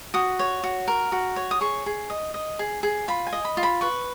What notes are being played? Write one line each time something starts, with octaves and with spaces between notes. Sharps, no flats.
F#4 D#6
C#5
F#4
A#4
F#4
C#5
D#6
G#4 C#6
G#4
D#5
D#5
G#4
G#4
F4 B5
G#5
D#5
B5
F4
B5
B4 C#6